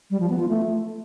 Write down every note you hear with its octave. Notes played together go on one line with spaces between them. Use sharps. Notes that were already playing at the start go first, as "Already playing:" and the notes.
G3
F3
B3
F4
A3